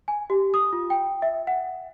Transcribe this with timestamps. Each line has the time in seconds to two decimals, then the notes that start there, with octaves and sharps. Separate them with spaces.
0.08 G#5
0.30 G4
0.54 D#6
0.73 F4
0.90 G5
1.22 E5
1.47 F#5